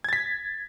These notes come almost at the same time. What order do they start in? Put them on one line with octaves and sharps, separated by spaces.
G#6 A6 B6